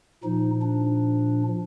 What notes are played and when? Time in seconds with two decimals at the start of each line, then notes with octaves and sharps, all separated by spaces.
0.24 A#2 F3 D#4
0.62 D4